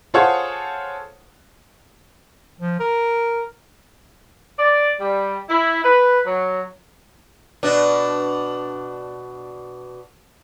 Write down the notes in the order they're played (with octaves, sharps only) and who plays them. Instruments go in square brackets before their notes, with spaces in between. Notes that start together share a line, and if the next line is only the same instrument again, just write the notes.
[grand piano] F4 G#4 A4 C5 C#5 F#5
[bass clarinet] F3
A#4
[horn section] D5
G3
E4
B4
F#3
[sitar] B2 D4